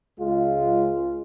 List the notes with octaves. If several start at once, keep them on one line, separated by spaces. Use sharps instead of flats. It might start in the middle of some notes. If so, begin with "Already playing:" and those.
C#2 G#3 F4